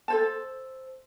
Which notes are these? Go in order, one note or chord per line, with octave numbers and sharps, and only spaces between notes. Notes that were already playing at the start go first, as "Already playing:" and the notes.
A4 C5 A5